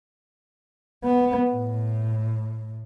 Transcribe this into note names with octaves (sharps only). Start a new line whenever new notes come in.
B3
A2